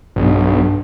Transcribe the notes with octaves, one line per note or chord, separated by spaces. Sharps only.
B1 G2